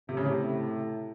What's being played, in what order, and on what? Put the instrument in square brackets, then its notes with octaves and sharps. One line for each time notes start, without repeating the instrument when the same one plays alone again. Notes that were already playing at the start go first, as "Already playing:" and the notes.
[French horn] A2 [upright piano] C3
[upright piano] C#3
C3